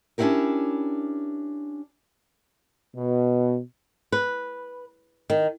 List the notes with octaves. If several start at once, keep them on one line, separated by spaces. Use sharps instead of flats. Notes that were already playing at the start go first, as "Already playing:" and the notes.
C#4 D4 E4 F#4 G4 A#4
B2
B4
D#3